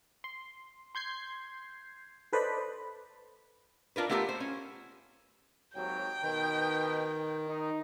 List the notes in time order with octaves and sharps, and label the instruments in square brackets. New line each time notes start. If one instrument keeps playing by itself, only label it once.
[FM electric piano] C6
C6 G6 G#6 C7
A4 B4 C5 D5 D#5 B5
[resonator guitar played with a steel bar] D4 F4 A#4 B4
A3 B3 F4 G4 A4 A#4
C5
C#4
[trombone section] G#1 D#2 F#3 [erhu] G5
[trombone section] B2 D#4 B4 [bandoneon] D#3
[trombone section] D#4